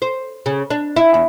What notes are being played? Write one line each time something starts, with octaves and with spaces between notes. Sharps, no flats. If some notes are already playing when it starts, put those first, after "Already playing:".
C5
C#3
D4
E4
E2